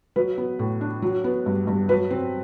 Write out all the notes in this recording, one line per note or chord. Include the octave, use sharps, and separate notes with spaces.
F#3 B4
B3
A2
D4
F#3
B3
G2
G2
F#3 B4
C4